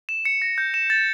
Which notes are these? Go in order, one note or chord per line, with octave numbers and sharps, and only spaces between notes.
E7
C#7
A#6
G6
E7
A6